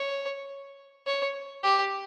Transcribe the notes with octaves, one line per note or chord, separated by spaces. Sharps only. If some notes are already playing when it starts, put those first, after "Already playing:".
Already playing: C#5
C#5
G4